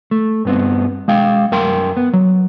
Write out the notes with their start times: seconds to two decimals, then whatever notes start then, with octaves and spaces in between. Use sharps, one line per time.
0.11 A3
0.45 G2 B3 C4
1.08 G#3 F5 G5
1.52 F#2 A#4 G5 C6
1.97 B3
2.13 F#3